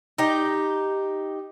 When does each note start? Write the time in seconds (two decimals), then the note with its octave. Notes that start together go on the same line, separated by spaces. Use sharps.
0.18 D#4 G4